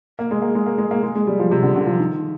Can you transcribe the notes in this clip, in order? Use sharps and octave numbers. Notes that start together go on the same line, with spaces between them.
A#3
G#3
A#3
G#3
A#3
G#3
A#3
G#3
G#3
G3
F3
C3
D3
D3
F3
D#3